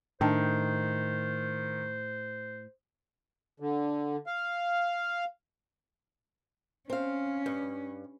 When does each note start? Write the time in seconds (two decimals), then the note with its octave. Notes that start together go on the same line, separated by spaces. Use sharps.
0.21 A2 D#3 D4 C5 G5 A5
3.60 D3
4.27 F5
6.90 C4 C#4 F5
7.46 G2